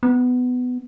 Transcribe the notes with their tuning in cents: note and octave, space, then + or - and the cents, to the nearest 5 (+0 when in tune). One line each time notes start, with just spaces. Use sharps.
B3 +15